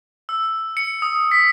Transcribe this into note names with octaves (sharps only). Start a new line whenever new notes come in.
E6
C#7
D#6
B6